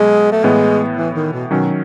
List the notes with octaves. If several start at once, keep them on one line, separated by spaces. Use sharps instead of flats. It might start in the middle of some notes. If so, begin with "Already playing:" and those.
Already playing: B2 F#3 G#3
A3
A2 E3 G#3 B3
E3
D#3
B2
B2 D#3 F#3 C#4